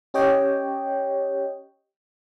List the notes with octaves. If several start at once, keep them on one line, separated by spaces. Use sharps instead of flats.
C#4 G4 C#5 D#5 G5